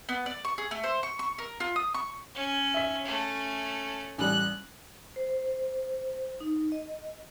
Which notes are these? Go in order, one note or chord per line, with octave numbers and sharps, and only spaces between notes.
B3
D5
C#6
G#4
A3
C5
C#6
C#6
A#4
F4
D#6
C#6
C#4
E5 B6
A3 C#4
A1 G3 F#6
C5
D#4
D#5